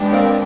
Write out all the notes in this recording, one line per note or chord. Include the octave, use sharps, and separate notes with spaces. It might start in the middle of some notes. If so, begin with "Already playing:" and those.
Already playing: G#3 B3 D4 G4
A#3 C4